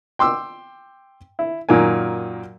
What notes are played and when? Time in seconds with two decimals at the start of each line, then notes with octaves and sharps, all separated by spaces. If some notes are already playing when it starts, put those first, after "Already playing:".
0.19 G5 C6 D6 E6
1.39 E4
1.69 F#2 A#2 D#3 A#4 G#5